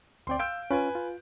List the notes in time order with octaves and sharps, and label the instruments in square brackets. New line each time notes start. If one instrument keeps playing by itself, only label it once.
[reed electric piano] D2 C4 D5 [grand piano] G5 C6
[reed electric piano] F5 [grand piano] E6 G6 D7
[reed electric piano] C#4 F4 [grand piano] B4 G#5
[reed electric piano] F4